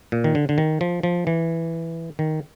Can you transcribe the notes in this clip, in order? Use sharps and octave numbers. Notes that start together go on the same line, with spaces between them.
A#2
D#3
D3
D3
D#3
F3
F3
E3
D#3